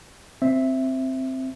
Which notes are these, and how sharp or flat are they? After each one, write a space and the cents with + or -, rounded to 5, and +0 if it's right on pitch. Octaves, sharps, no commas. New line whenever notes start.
C4 +0 E5 +5